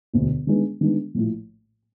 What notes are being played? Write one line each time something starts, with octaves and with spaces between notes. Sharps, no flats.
E1 D2 D3
D#3 G#3 B3 D4
D#3 G#3 B3 D4
A#1 A2 F3 A3